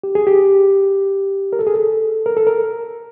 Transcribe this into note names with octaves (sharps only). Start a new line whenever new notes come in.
G4
G#4
G4
A#4
A4
G#4
A4
A#4
A4
A#4